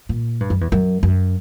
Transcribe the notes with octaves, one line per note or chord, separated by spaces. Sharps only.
A#2
G2
F#2
E2
F#2
F#2